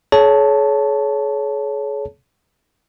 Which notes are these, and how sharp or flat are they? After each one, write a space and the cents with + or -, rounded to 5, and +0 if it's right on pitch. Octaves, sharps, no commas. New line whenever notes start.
G#4 +40 C#5 +15 A5 +0